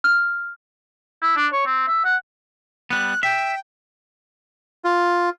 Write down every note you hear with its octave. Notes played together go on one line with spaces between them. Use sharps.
F6
E4
D4
C#5
C4
E5
F#5
G3 B3 F#6
E5 G5
F4